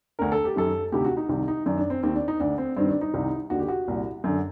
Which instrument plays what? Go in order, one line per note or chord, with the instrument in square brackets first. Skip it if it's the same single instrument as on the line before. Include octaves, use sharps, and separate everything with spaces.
[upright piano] D2 D3 A#4
A4
G4
F#2 D#3 A4
D2 C3 D#3 G4
F#4
D#4
C2 C3 D#3
D#4
F#2 D#3 D4
D4
C4
D#2 D#3 C4
D4
D#4
D2 D3 D4
C4
G2 D#3 C4
D4
D#4
C2 C3 D#3
D#2 D3 F#4
G4
F#4
C2 A#2
F#2 D3